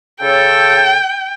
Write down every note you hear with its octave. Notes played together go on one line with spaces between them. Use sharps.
C#3 A4 G5